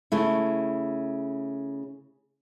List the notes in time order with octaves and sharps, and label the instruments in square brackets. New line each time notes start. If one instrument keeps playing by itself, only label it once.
[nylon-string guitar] C#3 A3 E4